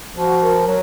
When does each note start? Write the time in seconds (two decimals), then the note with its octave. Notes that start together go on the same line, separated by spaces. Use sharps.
0.16 F3 F#4
0.42 A#4
0.67 F#3